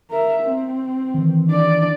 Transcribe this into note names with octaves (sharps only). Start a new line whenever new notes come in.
A#4 E5
C4
D#3 E3
D4 D5